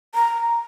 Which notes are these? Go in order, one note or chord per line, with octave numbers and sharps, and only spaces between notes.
A#5